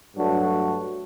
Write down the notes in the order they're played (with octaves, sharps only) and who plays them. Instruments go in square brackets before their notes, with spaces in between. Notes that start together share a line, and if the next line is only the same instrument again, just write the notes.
[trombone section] G2 F#3 A3 D4 F#4